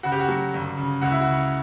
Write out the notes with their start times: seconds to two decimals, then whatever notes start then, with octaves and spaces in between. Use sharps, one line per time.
0.03 C#3 F#4
0.12 G4
0.20 F#4
0.28 F#3
0.54 G1
0.77 C#3
1.02 C#2 F#4
1.11 E4
1.21 F#4
1.27 C#3